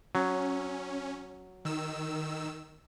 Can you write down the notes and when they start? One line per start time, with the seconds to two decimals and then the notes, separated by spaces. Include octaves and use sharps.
0.15 F#3 C#4
1.65 D#3 E6